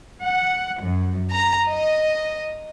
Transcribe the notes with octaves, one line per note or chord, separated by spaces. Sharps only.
F#5
F#2
A#5
D#5